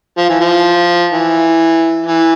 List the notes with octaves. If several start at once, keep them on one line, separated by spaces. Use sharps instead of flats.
F3
E3
F3
E3
E3